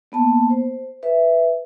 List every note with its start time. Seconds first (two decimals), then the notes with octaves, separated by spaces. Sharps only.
0.12 A#3 B3 A5
0.50 C5
1.03 B4 E5